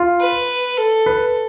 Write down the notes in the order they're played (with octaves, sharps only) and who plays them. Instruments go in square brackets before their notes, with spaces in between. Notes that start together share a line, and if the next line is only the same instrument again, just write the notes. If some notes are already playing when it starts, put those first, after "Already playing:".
Already playing: [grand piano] F4
[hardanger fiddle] B4
A4
[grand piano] B4